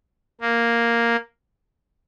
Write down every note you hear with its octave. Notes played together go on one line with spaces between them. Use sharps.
A#3